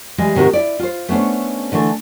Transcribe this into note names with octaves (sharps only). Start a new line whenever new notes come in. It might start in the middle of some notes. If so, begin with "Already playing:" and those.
E3 G3 G#3 E4
G#2 C3 D#3 D4 F#4 A#4
E4 D5
F4 C5
A3 B3 C#4 D4 C5
D3 E3 A3 D4 A4